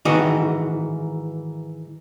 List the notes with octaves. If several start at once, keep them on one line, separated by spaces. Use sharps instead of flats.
G#2 D#3 E3 F#4 D#5